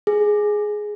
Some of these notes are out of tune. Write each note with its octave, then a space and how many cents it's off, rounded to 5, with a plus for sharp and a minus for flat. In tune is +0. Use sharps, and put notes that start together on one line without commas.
G#4 +5